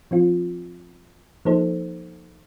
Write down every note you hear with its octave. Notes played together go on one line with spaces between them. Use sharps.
F3 C4 F4
F3 A#3 D#4 A4 C5